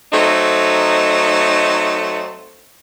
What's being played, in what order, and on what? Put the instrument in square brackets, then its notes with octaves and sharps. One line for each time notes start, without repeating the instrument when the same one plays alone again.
[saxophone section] F#3 A3 C4 D#4